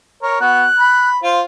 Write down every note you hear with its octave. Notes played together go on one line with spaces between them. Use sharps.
A#4 C#5
B3 F#4 F#6
B5
F4 C5